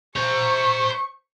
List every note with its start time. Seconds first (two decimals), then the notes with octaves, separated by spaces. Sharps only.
0.16 C5 A#5 C#6